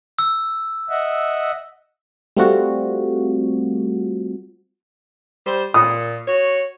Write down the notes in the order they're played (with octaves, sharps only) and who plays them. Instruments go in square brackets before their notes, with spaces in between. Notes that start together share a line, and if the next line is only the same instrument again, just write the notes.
[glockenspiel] E6
[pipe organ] D#5 E5 F#5
[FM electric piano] G3 A3 C4 F4 F#4
[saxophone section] G3 C5
[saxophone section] A#2 [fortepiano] D#6
[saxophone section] F#4 C#5